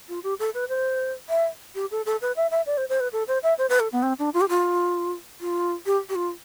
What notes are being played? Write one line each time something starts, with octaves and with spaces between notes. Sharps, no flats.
F4
G4
A4
B4
C5
E5
G4
A4
A4
B4
E5
E5
D5
C5
C5
B4
A4
C5
E5
C5
B4
A4
B3
C4
D4
F4
G4
F4
F4
G4
G4
F4